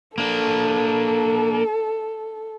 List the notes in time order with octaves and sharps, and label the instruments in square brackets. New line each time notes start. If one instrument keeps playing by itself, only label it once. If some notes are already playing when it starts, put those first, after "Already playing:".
[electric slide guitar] A#3 D4 [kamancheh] A4